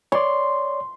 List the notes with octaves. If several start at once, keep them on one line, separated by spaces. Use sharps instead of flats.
C#5 D5 C6